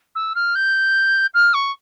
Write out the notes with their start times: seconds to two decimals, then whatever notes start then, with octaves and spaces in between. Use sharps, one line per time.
0.15 E6
0.35 F6
0.55 G6
1.34 F6
1.54 C#6